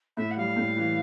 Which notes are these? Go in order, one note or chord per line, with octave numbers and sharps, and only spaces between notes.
A2 E5
F#5
G3 F5
A2
E3